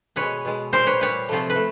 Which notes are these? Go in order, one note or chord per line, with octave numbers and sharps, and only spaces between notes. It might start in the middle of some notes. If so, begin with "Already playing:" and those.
B2 G#3 B4 C#5
B2 G#3
A#2 G3 A#4 C5
B4 C#5
A#2 G3 B4 C#5
C3 F3 A3
B4
A3